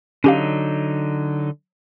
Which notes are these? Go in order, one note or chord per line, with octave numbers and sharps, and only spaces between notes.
D3 F#3 C#4 D#4 G4 F5